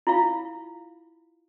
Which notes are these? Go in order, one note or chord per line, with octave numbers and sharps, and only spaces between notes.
E4 F4 F5